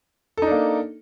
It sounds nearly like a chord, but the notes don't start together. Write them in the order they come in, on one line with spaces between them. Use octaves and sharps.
A4 D#4 D4 A#3